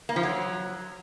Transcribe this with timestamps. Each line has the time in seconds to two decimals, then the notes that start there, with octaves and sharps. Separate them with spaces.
0.09 A#3
0.16 F3
0.23 F#3